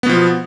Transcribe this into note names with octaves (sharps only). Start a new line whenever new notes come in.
B2 F3 B3